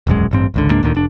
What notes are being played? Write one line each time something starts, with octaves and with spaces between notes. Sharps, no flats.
E1 A#1 F#2 G#3
A1 G2 C4
G#1 C#2 D3
C#2 G#2 A#3 D4
D2 A#2 D3 D#3
F1 D4